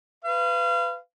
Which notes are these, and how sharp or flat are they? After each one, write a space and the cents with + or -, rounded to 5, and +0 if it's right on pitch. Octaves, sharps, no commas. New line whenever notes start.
B4 +20 F5 -30